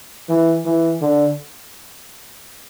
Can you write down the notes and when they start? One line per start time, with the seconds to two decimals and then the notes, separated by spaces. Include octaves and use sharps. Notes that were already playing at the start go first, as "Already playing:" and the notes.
0.29 E3
0.65 E3
1.01 D3